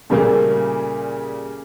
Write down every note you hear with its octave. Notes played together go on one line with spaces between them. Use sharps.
A#2 C#3 G3 A3 A#3 G#4